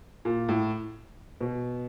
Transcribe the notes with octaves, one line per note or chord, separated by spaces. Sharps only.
A#2
A2
B2